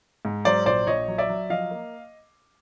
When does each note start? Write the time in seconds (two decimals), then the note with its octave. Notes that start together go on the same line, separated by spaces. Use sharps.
0.25 G#2
0.45 F#3 C5 D5
0.66 A#1 C5 D5
0.87 A#1 C#5 D#5
1.08 F#3
1.18 D5 E5
1.29 F#3
1.49 F3 D#5 F5
1.71 A#3